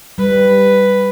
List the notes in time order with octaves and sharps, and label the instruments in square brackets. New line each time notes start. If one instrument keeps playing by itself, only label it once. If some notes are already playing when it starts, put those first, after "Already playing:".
[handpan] G3 [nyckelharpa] B4